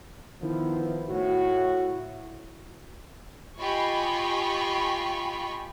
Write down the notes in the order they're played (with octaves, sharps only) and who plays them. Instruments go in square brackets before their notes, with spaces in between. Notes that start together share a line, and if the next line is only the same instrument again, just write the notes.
[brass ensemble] D#3 F3 B3 [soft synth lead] E4
[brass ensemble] A2 F#4
[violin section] F4 G4 D#5 G#5 B5 C#6